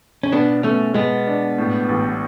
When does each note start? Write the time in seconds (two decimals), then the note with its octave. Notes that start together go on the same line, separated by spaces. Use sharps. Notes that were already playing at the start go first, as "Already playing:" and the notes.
0.23 C#4
0.32 B2 B3 D4
0.63 B2 A3 C#4
0.94 B2 G#3 B3
1.27 D4
1.58 A2
1.89 A1